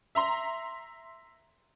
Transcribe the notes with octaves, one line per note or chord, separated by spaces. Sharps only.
E5 A#5 C6